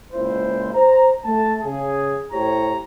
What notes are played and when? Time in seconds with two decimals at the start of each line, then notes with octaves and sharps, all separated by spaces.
0.12 C#2 A#2 E4 C5
0.74 C5 A#5
1.24 A3 A5
1.62 C#3 G#4
2.32 A2 G4 C5 C#5 A#5